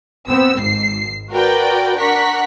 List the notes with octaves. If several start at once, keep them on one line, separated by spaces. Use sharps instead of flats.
B3 C4 E6
G#1 G#2 C7
F#4 A#4 B4 D5 G5
D4 A#4 F#5 C#6 B6